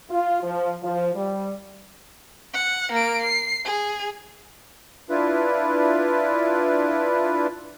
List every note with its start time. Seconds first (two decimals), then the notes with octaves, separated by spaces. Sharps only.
0.10 F4
0.43 F3
0.83 F3
1.14 G3
2.53 F#5
2.92 A#3 D7
3.22 C7
3.65 G#4
5.10 D4 E4 F4 B4